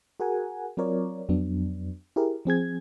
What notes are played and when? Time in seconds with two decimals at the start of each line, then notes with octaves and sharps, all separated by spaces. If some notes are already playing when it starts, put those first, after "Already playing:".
0.20 F#4 G#4 A#4 F#5 G#5
0.77 F#3 C4 F4 A#4 C#5 D5
1.29 F2 F#3 B3 D4
2.16 E4 G4 G#4 A#4
2.45 F3 C4 G#4 G#6